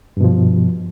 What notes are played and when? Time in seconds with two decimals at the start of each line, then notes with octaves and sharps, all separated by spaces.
0.17 G2
0.21 B2
0.24 F3